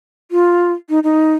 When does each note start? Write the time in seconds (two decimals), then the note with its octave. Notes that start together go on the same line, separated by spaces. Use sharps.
0.31 F4
0.89 D#4
1.04 D#4